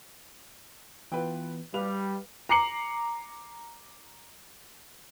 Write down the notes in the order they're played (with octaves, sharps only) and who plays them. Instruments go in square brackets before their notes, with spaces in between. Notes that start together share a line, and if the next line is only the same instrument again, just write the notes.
[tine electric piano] E3 B3 [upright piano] F4 B4 G5
[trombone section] G3 [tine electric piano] G4 [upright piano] B4 F5 F7
[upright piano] A#5 D6 C7 C#7 F#7